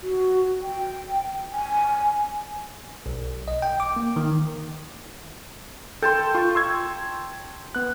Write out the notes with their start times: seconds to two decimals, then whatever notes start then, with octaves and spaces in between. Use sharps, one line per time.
0.02 F#4
0.61 G5
1.52 G#5
3.06 B1
3.48 D#5
3.62 G5
3.80 D6
3.96 A#3
4.16 D#3
6.02 A4 G5 A5 C6
6.35 F4 C#6
6.55 C6 E6 G#6
7.75 B3 F#6